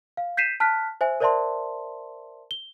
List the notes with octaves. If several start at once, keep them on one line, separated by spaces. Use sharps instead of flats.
F5
G6 B6 C7 D#7 E7
A5 F6 F#6 B6
C5 E5 G#5
A#4 C5 D5 E5 A5 C6
G7